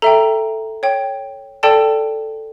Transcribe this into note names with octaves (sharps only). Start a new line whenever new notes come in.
A4 E5 G5 A#5
C#5 G5
A4 D5 G5 A5